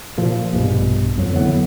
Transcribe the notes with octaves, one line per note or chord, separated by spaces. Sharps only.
A#2 F3
A#1 G2 B2
F2 F#3
D3 E3 F#3 B3